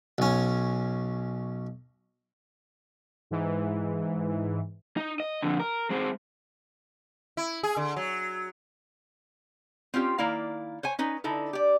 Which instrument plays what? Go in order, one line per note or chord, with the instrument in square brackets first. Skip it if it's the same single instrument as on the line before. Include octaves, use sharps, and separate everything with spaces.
[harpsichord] B1 C#4
[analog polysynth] G#2 E3
[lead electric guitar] D#4
D#5
F2 D3
A#4
G#3 C4
[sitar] E4
G#4
D3
F#3
[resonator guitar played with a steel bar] C4 C#4 F4 G4
D#3 A#3 E4 D5 F5
C5 C#5 G#5
C#4 D#4 B4
D3 D#4 E4 A4
G4 D5